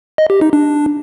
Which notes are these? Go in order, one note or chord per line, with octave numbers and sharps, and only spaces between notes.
D#5
G4
D#4
D4